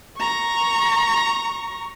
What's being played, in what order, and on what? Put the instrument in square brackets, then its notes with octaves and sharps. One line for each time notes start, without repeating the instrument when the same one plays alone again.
[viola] A#5 C#6